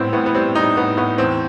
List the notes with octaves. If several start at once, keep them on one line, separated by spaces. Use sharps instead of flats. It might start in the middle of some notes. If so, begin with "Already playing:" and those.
Already playing: A2 G3 B3 C4 E4 G4
A2 B3
B3
G3 C4
G3 D#4
A2 B3
A2 B3
E2 C4